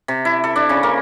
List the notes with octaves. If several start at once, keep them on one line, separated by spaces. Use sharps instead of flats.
C3
E4
A4
D4
C#3
A#3